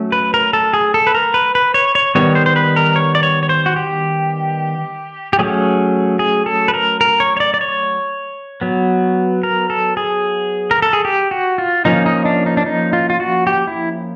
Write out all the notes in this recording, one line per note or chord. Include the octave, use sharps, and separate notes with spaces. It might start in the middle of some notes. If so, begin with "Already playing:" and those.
Already playing: F#3 A3 C#4
B4
A#4
A4
G#4
A4
B4
A#4
B4
B4
C#5
C#5
D#3 G3 B3 C#5
C5
C5
B4
A#4
C#5
D5
C#5
C#5
C5
F#4
G4
G4
F#3 A3 C#4 G#4
G#4
A4
B4
A#4
A#4
C#5
C#5
D5
D5
C#5
F#3 B3
A#4
A4
G#4
A#4
A4
G#4
G4
F#4
F4
F3 A#3 C#4 D#4
D#4
D4
D#4
D4
D#4
F4
F4
F#4
G4
E4